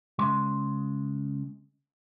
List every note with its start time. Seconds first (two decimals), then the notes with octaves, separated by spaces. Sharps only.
0.19 C#3 G#3 C6